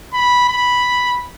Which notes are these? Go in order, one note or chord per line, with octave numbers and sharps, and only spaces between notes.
B5
B5